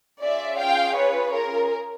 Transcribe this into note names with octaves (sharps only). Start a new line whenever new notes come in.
C#4 F4 G#4 D5 E5
F5 G5
B4 C#5
A#4